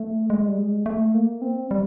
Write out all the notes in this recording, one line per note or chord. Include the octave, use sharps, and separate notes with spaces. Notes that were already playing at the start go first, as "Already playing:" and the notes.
Already playing: A3
G#3
G3
G#3
A3
A#3
C4
G3